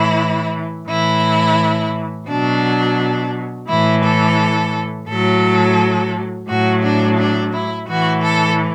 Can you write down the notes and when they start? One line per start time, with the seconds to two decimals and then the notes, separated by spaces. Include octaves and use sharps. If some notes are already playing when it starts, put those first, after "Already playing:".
Already playing: A2 E3 E4
0.88 A2 E3 E4
2.28 B2 F#3 D4
3.69 A2 E3 E4
4.03 A4
5.08 A2 F#3 A4
6.49 A2 F#3 F#4
6.84 D4
7.19 D4
7.54 E4
7.88 A2 E3 F#4
8.23 A4